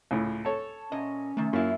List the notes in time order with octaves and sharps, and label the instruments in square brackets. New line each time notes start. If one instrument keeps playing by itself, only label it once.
[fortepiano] C#2 A2
[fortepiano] A4 C#5 [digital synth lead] A5
[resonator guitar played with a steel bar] A#2 D#5 [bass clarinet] C#4
[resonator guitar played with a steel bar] C3 D#3 [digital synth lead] A3
[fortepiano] F#2 [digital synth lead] A#3 [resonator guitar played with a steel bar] E4 F4